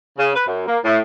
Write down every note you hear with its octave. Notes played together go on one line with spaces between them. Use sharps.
C#3
B4
F#2
A#3
A2